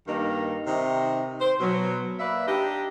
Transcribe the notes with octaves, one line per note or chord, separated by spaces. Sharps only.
G2 D#3 A#3 D#4
C3 D#3 D#4
C5
B2 F#3
A#3 B4 D5 E5
D4 D#4 G4